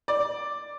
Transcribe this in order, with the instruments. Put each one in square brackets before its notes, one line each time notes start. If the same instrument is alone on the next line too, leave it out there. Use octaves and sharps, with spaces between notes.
[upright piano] D5